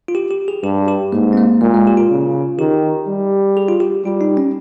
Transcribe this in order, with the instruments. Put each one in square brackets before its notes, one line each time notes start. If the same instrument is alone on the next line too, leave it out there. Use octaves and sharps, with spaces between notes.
[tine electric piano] F4
G4
G4
G#4
[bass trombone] G2 [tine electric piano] G4
[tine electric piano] G4
[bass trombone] G#2 [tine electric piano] A#3
[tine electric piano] C4
A#3
[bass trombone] A#2 [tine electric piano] G#3
[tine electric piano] G#3
G4
F4
[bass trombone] C#3
[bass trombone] D#3 [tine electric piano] G4
[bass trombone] G3
[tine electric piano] G#4
F4
G4
[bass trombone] G3 [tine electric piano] F4
[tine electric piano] D#4
C#4